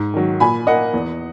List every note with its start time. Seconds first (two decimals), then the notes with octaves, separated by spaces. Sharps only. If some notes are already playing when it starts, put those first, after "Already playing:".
Already playing: G#2
0.14 D#3 F#3
0.40 A#2 G#5 B5
0.67 A#3 D#5 F#5
0.94 E2